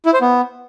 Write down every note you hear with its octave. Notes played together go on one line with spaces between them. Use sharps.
E4
C5
B3